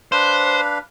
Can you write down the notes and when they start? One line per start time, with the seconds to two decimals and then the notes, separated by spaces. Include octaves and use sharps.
0.12 D4 B4 C5 F5